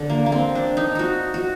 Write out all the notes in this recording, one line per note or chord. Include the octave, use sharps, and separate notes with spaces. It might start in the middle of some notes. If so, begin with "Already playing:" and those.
Already playing: D3
A#3
A#3
C4
D4
D#4
D#4 F#4
F#4